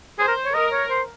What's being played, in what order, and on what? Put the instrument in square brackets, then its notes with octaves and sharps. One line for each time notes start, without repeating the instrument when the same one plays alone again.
[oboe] G#4 [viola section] C5
[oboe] A#4
C#5
[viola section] A#4 [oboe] D#5
[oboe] C#5
C5